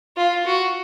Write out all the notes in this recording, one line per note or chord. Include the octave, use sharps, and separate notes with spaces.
F4
F#4